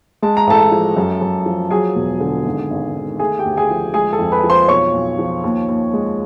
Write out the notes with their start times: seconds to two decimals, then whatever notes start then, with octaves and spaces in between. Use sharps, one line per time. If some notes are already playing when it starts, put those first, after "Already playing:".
0.22 G#3 A5
0.37 A#5
0.47 A1 A4 A5
0.72 F3
0.97 F#2
1.21 F#2
1.46 F3
1.71 F#3 G#4 G#5
1.95 E1
2.20 D3
2.45 G#1
2.70 G#1
2.95 D#3
3.19 A3 G#4 G#5
3.39 G4 G5
3.45 D2
3.57 G#4 G#5
3.70 F3
3.94 G#3 G#4 G#5
4.12 A4 A5
4.19 F2
4.32 B4 B5
4.44 F3
4.50 C5 C6
4.68 B1 C#5 C#6
4.93 B1
5.19 F3
5.44 D#2
5.69 D#2
5.93 G#3